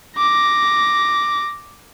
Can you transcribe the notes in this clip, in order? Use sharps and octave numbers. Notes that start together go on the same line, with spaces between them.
D6 A#6